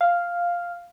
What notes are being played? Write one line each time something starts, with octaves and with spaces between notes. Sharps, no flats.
F5